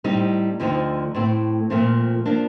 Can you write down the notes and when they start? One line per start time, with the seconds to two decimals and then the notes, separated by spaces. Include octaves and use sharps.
0.04 A2 G3 C4 D#4
0.60 D2 D3 F3 C4 D#4
1.15 A2 A3 C4
1.70 A#2 F3 A3 C4
2.26 F3 A#3 D4